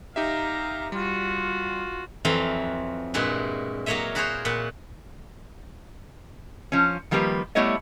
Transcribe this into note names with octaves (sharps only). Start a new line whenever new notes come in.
D#4 G4 E5 F5 A#5
G3 F4 F#4
F2 E3 F#3 C4 F5
G2 A#2 G#3 E4 F#4
F#3 A#3 A#4 C#5 D#5 E5
E4 F#4 G#4 A#4 C5 C#5
A#2 F#5 B5
F3 C#4
D#3 F3 G3 A#3 G4 B4
G3 A3 B3 E4 C#5 D#5